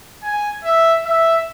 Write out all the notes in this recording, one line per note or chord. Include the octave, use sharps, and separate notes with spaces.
G#5
E5
E5